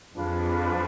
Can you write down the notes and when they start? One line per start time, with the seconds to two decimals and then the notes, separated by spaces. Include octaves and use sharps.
0.14 F2 F3 D4 F4 G#4 B4